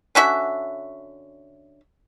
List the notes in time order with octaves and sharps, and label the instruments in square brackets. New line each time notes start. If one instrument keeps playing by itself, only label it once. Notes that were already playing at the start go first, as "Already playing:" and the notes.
[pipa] D3 C#4 F#4 E5